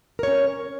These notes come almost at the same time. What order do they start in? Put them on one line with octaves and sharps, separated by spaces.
A#4 C#5 C#4